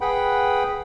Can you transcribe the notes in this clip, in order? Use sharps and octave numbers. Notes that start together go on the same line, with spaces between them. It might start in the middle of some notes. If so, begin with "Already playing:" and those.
G#4 B4 F#5 G5 B5